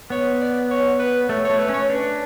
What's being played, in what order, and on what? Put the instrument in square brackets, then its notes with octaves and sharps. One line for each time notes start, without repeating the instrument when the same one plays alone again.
[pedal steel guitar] B3 [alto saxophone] C#5
[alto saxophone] D5
C#5
B4
[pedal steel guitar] A3 [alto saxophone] C#5
[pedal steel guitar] A3 [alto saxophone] C#5
[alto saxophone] B4
[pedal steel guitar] C#4
[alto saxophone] C#5
[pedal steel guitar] D4 [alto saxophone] B4